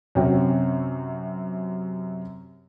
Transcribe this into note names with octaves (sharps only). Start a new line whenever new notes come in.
F#2 C3 C#4 F#4 G5